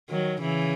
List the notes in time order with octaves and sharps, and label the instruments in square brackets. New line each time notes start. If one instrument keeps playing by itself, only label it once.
[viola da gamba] D#3 F#3
C#3 E3